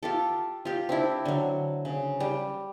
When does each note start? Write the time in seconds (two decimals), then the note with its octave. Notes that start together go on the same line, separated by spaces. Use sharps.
0.03 F4 G4 A4
0.65 F4 G4
0.89 C4 D4 E4
1.25 D3 F#3
1.85 C#3
2.20 G3